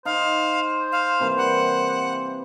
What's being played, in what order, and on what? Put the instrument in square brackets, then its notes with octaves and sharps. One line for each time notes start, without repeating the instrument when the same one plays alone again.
[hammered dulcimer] D#4 [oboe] C5 [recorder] F5
[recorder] F5
[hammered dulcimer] C3 E3 A#3
[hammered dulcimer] G3 [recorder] F#5